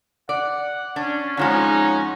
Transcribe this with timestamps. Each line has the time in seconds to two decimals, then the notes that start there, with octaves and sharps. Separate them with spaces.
0.29 D5 F#5
0.96 C#4 D4
1.37 F2 F3 G#3 C#4 D#4 F#5